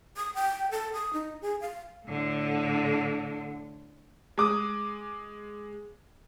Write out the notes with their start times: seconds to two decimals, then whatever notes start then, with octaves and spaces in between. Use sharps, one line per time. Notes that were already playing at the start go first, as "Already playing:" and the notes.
0.17 D#6
0.35 G5
0.71 A4
0.94 D#6
1.13 D#4
1.42 G#4
1.61 F5
2.06 A2 D3
4.38 G#3 D6 D#6